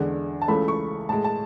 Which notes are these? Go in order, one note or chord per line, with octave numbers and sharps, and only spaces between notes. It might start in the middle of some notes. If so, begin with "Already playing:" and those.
Already playing: E2 D3 G#3
A5
C#2 C#3 E3 A3 B5
C#6
A2 G#3 A5
A5